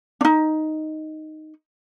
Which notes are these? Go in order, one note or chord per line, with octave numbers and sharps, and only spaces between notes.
D4 D#4